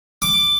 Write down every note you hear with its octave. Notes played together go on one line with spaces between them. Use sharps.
D6